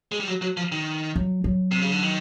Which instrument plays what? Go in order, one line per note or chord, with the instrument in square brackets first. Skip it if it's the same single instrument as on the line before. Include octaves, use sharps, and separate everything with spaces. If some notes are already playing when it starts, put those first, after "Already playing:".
[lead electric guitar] G#3
G3
F#3
F#3
F3
D#3
[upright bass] F#3
F#3
[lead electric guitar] C3
C#3
D3
D#3